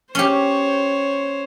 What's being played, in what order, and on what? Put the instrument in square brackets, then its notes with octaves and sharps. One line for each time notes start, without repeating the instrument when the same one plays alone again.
[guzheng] C#4 G4 [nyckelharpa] C5 C#5